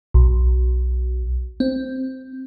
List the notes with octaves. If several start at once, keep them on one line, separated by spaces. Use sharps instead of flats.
B1
C4